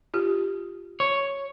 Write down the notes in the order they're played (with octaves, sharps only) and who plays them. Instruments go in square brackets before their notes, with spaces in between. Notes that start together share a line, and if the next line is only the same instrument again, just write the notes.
[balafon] F4 G4
[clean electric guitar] C#5